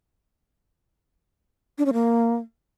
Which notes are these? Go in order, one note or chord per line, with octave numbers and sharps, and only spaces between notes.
D4
C#4
A#3